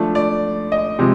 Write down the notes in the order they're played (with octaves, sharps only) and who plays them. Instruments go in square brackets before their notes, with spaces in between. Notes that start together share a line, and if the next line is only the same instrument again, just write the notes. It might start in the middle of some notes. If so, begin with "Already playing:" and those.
Already playing: [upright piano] F3 A3 D4
D5
D#5
C3 F3 G#3